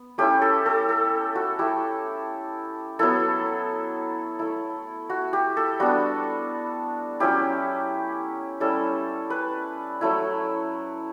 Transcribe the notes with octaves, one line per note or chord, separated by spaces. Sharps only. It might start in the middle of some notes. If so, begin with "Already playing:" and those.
Already playing: B3
A3 C#4 E4 G4
A4
A4
A4
F#4
A3 E4 G4
F#3 B3 E4 A4
A3 E4
F#4
G4
A4
G3 B3 D4 F#4
F#3 C#4 E4 G4
G3 C#4 E4 A4
B4
F#3 A3 E4